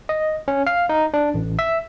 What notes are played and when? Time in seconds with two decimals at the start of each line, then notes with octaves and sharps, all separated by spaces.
0.09 D#5
0.48 C#4
0.67 F5
0.89 D#4
1.14 D4
1.34 A1
1.59 E5